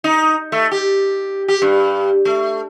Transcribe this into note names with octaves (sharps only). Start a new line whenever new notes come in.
D#4
A3
G4
G4
G2
A3